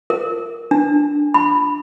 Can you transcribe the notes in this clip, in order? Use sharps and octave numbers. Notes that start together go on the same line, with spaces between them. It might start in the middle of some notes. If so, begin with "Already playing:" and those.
A#4
D4
B5